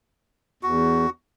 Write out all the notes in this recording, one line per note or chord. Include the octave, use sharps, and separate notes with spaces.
E2 F#4